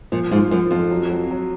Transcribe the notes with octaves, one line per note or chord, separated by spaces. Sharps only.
A#2 F3
G#2 F4
F#2 F3
F2 F4
F#3
F#3
F#3